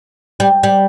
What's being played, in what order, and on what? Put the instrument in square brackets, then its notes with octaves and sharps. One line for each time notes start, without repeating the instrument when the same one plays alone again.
[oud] G3
G3